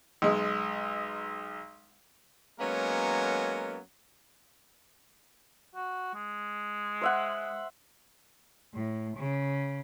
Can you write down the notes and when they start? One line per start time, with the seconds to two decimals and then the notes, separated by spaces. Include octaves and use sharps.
0.22 B1 G#3
2.60 F#3 G#3 A#3 B3 C#4 A#4
5.75 F#4
6.14 G#3
7.01 C5 E5 F#5
8.74 A2
9.18 C#3